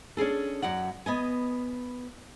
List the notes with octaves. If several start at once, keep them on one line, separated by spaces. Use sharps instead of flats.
C#4 D4 G#4 A4
F#2 F#4 D5 F#5
B3 D#5 G#5